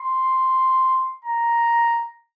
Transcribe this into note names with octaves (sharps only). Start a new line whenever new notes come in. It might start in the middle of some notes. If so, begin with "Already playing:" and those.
Already playing: C6
A#5